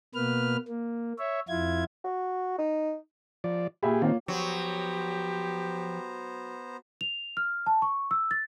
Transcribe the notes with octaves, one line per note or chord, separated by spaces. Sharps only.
B2 A#3 B4 F6
A#3
C#5 E5
F2 E4 F4 G#6
F#4
D#4
F3 D5
A#2 G4 G#4 E5 B5
D#3 A#3 C4 F4 C#5
F3 F#3 B3 G4 C5 A#5
F7
F6
A5
C#6
E6
A6